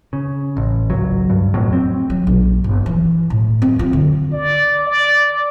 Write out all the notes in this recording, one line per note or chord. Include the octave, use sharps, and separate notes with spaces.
C#3
A1
G#1 C#2 F#3
G2
E1 F2 A2 F#3
C4
F#3
A#1
G1
E3
A2
C4
F4
D3
D5
D5